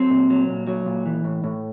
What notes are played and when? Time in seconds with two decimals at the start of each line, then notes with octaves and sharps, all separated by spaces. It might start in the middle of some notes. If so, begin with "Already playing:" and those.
Already playing: F#3 C4
0.10 A#2
0.30 F#3
0.49 A#2
0.67 F#3
0.86 A#2
1.06 E3
1.24 A2
1.44 A2